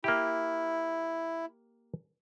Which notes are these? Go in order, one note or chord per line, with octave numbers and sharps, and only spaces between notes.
A#3 E4 G4